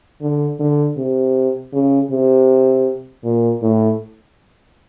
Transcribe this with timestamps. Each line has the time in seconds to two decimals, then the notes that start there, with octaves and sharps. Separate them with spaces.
0.21 D3
0.59 D3
0.97 C3
1.73 C#3
2.11 C3
3.24 A#2
3.62 A2